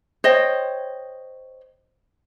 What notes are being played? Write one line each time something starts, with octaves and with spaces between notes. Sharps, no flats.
C5 C#5 D#5 G5